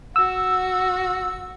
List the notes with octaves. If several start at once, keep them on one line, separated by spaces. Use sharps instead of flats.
F#4 E6